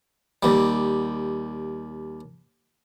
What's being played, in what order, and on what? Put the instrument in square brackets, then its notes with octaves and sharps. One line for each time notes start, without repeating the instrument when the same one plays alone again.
[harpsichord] D#2 G3